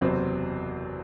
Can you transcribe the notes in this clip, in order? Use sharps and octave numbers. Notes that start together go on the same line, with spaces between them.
F#1 E2 C3 F#3 C4